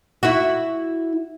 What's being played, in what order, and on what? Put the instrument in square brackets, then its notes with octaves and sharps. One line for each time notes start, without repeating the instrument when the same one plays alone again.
[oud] E4 F#4